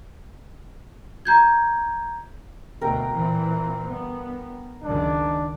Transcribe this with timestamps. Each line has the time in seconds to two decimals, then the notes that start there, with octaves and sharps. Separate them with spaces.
1.25 A#5 G6 G#6
2.81 D2 B2 A3 A#4 G5
3.13 A#2 E3 C4
3.88 G2 B3
4.83 C#2 F#2 D#3 D4